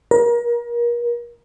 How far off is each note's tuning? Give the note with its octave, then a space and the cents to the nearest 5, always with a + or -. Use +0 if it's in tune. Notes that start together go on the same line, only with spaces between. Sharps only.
A#4 +30